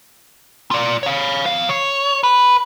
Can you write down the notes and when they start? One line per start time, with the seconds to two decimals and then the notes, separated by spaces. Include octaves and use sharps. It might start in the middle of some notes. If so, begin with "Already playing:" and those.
0.71 F4 D5
1.03 C#5 F5
1.46 F2 F5
1.69 C#5
2.23 B4